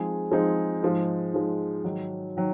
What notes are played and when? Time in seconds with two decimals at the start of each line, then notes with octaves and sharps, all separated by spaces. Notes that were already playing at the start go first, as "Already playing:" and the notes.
Already playing: F3 G#3 C4 D#4 G#4
0.32 F3 G#3 C4 D#4 G#4
0.82 G#2 F3 G#3
1.33 G#2 F3 G#3
1.84 G#2 D#3 F#3
2.37 D#3 F#3